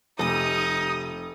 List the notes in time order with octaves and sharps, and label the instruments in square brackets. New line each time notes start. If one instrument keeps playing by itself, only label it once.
[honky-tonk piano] F1 [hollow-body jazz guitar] C3 A4 [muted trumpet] D#4 [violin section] D#6